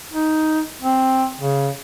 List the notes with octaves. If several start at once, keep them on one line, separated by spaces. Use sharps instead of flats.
D#4
C4
C#3